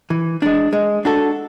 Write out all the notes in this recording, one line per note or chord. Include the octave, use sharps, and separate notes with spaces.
E3
G#3 D4
G#3
D4 F#4 A4